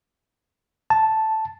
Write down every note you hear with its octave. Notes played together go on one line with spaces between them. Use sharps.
A5